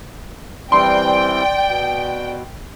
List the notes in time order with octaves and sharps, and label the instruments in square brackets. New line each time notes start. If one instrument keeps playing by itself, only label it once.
[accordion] E3 G3 C4 [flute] D5 [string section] G5 [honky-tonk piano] C6
[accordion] B2